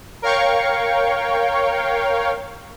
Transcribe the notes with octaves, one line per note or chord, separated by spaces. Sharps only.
A#4 C#5 F5 G5 C#6